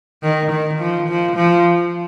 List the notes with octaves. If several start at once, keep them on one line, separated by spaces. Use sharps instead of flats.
D#3
D#3
F3
F3
F3